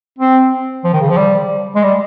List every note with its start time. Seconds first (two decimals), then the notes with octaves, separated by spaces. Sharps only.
0.19 C4
0.85 F3
0.93 D#3
1.01 C#3
1.10 F3
1.17 G3
1.76 G#3
1.83 G3